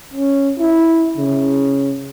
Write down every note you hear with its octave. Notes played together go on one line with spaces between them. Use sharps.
C#4
E4
C#3